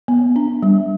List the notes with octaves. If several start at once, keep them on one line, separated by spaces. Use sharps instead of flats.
B3
D4
G3